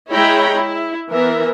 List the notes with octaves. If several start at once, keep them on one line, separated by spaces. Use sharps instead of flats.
G#3 E4 C#5 G5 A#5 B5
E4
E3 B3 A#4 E5